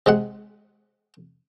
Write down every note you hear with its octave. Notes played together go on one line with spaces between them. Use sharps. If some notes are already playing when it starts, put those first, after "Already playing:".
C3 G#3 F#5